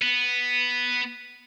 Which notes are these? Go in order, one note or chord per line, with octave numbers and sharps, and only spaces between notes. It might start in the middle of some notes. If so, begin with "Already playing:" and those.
B3